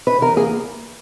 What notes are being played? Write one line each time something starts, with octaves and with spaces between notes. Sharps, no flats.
B2 B4
E2 A#4
A#3 G#4